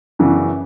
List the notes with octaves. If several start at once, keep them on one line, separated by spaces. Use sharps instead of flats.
F#2 C#3 E3 B3 D4